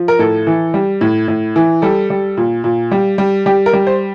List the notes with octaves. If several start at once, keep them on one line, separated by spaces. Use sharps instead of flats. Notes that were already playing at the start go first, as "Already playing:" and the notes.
Already playing: F3
A#4
A2 A4
E3
G3
A2
A2
E3
G3 A4
G3
A#2
A#2
G3
G3
G3 G4
A#4
G3
C5